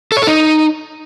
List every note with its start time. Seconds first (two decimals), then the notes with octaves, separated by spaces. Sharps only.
0.12 A4
0.17 C#5
0.22 A4
0.27 D#4